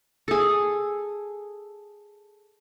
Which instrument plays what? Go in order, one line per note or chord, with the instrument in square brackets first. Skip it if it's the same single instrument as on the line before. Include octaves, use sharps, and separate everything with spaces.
[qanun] G#4 A4